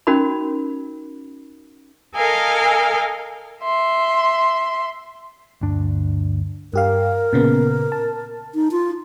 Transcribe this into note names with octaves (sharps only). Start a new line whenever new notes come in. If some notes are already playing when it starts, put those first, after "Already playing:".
C#4 D#4 F#4 A#4 B5
A4 A#4 D#5 F5 G#5
E5 C6
D2 G2 D4
G2 G4 A#4 F5
A#2 C#3 B3
A5
D#4
F4